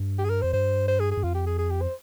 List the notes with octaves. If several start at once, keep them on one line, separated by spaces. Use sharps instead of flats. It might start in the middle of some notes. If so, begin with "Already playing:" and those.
Already playing: G2
G4
G#4
A#4
F2 C5
G2 C5
C5
G#4
G#4
G2
F2 F4
G4
G#4
G#4
G4
C5